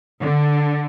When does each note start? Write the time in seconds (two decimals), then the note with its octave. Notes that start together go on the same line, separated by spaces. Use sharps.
0.22 D3